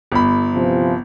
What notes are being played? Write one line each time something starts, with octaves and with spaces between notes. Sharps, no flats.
G1 B5
C3 E3 F3